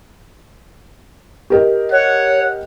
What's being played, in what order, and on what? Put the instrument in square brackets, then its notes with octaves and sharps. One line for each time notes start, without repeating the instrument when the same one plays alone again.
[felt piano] G4 A#4 D#5
[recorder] C#5 [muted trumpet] F#5